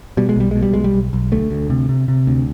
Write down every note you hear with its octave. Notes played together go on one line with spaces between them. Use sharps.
B2 G3
G#3
B1 G3
B2 G#3
G3
B1 G#3
G3
B1
B1
D2 A3
D2
C3
C3
C3
D2